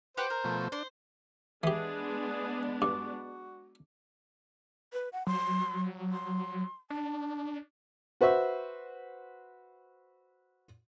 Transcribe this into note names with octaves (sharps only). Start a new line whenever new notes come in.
G4 B4 C5 F#5
A#4
B2 F3 A3
D4 C5
E3 G#3 B3 D4 G4 G#4
G2 F#4 D6
B4
F#5
F#3 C6
C6
D4 A5
F#4 B4 C5 E5